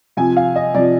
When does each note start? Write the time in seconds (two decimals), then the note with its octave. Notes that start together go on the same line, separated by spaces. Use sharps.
0.17 C3 F3 G#5
0.37 F5
0.56 D#5
0.74 C3 F3 D5